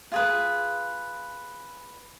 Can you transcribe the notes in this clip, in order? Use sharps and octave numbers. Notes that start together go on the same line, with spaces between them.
F4 G#4 B4